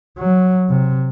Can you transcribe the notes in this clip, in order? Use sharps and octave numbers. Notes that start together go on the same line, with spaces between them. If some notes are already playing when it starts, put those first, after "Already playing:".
F#3
C3